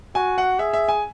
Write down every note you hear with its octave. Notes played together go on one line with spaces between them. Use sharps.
F#4 G#5
F#5
G#4 E5
E5
G#5